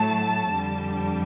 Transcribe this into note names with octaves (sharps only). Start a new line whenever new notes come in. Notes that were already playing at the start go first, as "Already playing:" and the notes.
Already playing: A2 F#3 A3 A5
F2 D3 G3